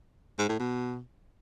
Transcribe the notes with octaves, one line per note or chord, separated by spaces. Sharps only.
G#2
A2
B2